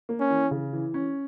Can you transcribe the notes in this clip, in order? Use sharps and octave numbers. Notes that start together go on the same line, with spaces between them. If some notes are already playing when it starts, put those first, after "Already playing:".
A#3
C#4
E3
C#3
E3
C#4